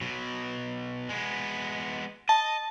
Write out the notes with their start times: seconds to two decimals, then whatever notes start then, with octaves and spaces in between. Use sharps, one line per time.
0.01 B2 F#3
1.09 G#3 B3
2.29 D#5 A5